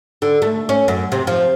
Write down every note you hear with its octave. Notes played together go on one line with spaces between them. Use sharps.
D3
A3
C#4
F#2
C3
F3